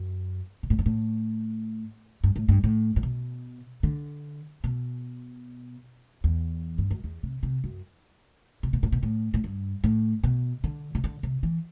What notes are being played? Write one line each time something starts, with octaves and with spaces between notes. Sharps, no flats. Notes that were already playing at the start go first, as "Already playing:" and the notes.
Already playing: F#2
B2
A2
G2
A2
G2
A2
G2
A2
A2
B2
D3
B2
E2
G2
F#2
E2
C3
C3
F#2
C3
B2
A2
B2
A2
A2
G2
A2
B2
D3
C3
D3
C3
E3